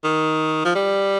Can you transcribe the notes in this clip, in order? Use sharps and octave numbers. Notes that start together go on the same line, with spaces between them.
D#3
F3
G3